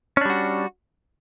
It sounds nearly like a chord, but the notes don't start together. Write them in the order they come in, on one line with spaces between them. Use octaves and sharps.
C#4 D4 G3 F#4